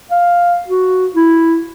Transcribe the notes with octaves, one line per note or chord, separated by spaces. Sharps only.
F5
F#4
E4